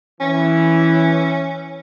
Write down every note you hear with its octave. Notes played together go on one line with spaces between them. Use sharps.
E3 C#4